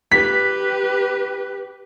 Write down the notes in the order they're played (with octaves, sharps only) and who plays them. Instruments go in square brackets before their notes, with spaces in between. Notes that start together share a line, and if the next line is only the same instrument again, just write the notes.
[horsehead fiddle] G4 B4 [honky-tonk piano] B6